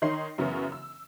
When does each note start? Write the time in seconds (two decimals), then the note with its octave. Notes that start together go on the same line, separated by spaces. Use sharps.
0.02 D#3 D#4 C#5 D#5 C6 C7
0.38 F#2 C#3 E3 B3 C#4 E4
0.72 E6